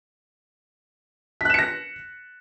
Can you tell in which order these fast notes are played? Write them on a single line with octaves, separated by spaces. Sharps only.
B6 F#6 E7 C#7 A#6